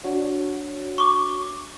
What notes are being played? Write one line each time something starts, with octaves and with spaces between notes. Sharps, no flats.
D4 F#4 C#5
C#6 D6